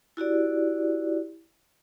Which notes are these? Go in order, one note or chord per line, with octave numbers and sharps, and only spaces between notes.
E4 F#4 G4 D5